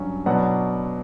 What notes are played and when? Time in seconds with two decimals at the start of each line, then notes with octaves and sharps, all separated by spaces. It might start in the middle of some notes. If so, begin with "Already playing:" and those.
Already playing: G2 F#3 C#4
0.26 B2 F#3 B3 D4 D5 F#5